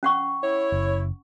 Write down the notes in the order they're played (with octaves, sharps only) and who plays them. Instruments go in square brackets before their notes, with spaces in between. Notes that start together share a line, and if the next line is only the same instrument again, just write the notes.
[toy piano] C#4 F#5 C#6
[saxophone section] E4 C#5
[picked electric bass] F#1